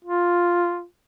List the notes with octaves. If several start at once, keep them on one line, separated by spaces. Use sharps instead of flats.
F4